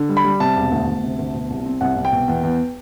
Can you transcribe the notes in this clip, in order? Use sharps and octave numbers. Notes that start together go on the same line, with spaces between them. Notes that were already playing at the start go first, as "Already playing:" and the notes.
Already playing: D3
G3
B5
G3
C3 A5
E1
D2
D2
C3
D2
B2
C2
C4
C2 F#5
C2
G5
B2
E2
E2